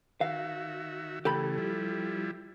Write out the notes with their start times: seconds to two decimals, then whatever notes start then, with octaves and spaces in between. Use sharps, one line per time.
0.21 D#3 F#4 E5 F5
1.25 C#3 E3 A3 G4 A4 B5
1.58 F3 G3 E4